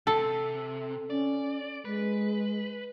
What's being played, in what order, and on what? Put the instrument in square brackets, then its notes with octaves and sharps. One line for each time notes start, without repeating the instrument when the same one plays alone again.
[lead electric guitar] C3 [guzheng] A4
[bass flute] C#4 [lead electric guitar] D5
[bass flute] G#3 [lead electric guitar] B4